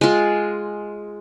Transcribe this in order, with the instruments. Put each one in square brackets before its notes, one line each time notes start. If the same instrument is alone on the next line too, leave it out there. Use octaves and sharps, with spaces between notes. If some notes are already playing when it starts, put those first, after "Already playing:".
[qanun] G#3 F4